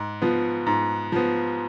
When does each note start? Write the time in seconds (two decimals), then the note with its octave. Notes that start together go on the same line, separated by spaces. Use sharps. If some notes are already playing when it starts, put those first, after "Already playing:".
Already playing: G#2
0.22 F3 B3
0.66 G#2
1.12 F3 B3